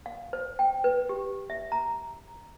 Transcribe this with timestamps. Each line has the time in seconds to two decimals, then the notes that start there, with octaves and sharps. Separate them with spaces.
0.06 F5
0.33 C5
0.59 G5
0.84 B4
1.09 G4
1.50 E5
1.72 A#5